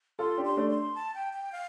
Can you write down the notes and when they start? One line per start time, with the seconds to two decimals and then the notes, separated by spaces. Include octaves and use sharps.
0.19 F4 A4 C6
0.38 D4 G4
0.45 C6
0.57 A3 D4
0.70 C6
0.95 A5
1.14 G5
1.33 G5
1.52 F5